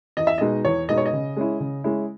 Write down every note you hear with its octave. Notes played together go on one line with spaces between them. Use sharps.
E2 D#5
E5
B2 G#3 D#4 D#5
E2 C#5
B2 G#3 D#4 D#5
C#5
D#5
C#3
G#3 C#4 E4
C#3
G#3 C#4 E4